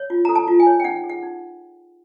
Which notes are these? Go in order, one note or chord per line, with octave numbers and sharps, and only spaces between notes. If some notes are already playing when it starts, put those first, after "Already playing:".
Already playing: C#5
F4
A4 A#5
A5
F4
G#5
C#5
G5
D#4 F#5
G#4
F#5
D#4